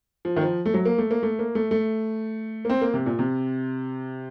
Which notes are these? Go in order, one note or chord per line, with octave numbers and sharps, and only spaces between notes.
F3
D#3
F3
A3
F#3
A#3
A3
A#3
A3
A#3
A3
A3
A#3
C4
A#3
C3
A#2
C3